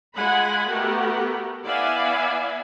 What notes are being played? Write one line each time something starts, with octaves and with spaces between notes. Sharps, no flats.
G#3 F4 F#5 G#5 B5
A3 B3 F#4 G4 A#4
B3 E4 D5 E5 F5 G#5